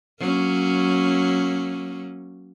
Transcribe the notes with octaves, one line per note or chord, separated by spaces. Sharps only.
F#3 A#3 C#4